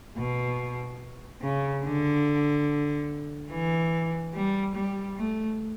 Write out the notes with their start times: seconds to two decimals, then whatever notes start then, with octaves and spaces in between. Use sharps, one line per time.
0.17 B2
1.42 C#3
1.84 D3
3.51 E3
4.34 G3
4.75 G3
5.16 A3